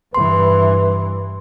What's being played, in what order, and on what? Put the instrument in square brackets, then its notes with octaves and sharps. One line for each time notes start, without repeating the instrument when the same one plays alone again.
[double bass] G2 E3 [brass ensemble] B4 [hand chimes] C6